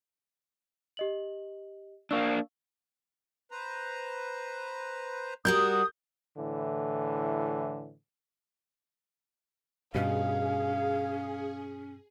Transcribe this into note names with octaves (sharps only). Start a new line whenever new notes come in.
G4 D#5 F#7
A#3 D4 F5 C#6 E6
B4 C5 A#5
G3 F#4 A#4 D#6 G6
A2 D3 E3
G2 B2 C#4 G#4 F5